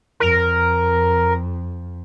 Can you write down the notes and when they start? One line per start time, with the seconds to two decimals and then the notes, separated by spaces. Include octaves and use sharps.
0.20 F2 A#4